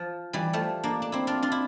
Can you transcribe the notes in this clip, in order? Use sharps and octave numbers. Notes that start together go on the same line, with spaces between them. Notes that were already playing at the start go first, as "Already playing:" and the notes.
Already playing: F3
E3 G3
F3 A3
A#3 D4
D4
C4 E4
D4 F4
D4 F4
E4